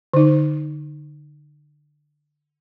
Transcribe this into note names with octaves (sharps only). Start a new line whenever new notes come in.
D3 D#4